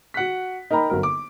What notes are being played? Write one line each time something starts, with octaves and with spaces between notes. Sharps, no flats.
F#4 F#5 F#6 B6
D#4 A#4 G5 A#5 B5
G1 F#3 A#4
D6